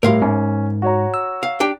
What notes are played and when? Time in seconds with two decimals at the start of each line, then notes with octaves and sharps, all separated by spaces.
0.03 A2 G3 A#4 F5 C6
0.22 G#2 C#4
0.82 F#4 C#5 A#5
1.14 E6
1.43 F5
1.60 D4 G4 G5